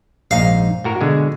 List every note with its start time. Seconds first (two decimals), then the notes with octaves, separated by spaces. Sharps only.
0.31 A#1 G#2 D#4 F5
0.84 A2 F#4 A#4
1.01 B2 D3 G#3